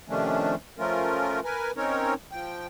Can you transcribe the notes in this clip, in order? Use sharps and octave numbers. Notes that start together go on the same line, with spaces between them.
C3 D#3 F3 A3 C#4 D4
F3 A3 C#4 F4 A#4
A#4 B4 G#5
C4 C#4 D#4 A#4 C#5
F3 G5